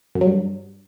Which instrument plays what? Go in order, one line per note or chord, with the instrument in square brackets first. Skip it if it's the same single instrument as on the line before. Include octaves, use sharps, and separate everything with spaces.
[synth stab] F#2
F#3
G2